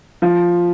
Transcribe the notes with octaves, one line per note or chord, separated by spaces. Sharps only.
F3